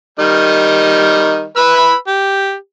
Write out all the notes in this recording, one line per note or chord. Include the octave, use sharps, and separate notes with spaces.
D#3 G3 D#5
B4 B5 E6
G4